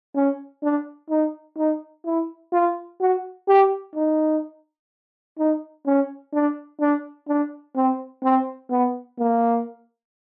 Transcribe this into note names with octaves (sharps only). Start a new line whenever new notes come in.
C#4
D4
D#4
D#4
E4
F4
F#4
G4
D#4
D#4
C#4
D4
D4
D4
C4
C4
B3
A#3